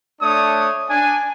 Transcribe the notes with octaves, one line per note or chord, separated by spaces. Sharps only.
A3 D4 C#5 D#6
D4 G#5